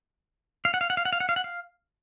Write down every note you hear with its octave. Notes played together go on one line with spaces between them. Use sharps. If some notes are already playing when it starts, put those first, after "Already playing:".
F5
F#5
F5
F#5
F5
F#5
F5
F#5
F5
F#5
F5